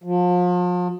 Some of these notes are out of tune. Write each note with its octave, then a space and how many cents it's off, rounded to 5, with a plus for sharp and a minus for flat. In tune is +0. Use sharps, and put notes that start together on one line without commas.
F3 +35